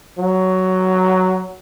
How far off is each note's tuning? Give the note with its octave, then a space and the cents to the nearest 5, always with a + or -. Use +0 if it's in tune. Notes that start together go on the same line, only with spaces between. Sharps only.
F#3 +10